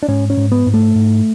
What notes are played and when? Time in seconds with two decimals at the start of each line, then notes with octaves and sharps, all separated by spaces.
0.03 D4
0.08 G#2 C#4
0.30 C#4
0.37 G#2
0.52 B3
0.66 G#2
0.74 A3
0.95 G#2